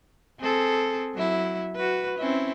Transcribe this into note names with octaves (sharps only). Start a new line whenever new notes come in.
C4 G#4 A4
F#3 E4
F#4 B4
C4 C#4 E4